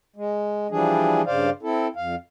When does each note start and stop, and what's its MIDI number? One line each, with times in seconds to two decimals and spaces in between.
0.16 0.67 56
0.71 1.22 52
0.71 1.22 53
0.71 1.22 55
0.71 1.22 62
0.71 1.22 68
1.26 1.50 43
1.26 1.50 49
1.26 1.50 72
1.26 1.50 74
1.26 1.50 77
1.63 1.88 60
1.63 1.88 64
1.63 1.88 69
1.96 2.15 41
1.96 2.15 77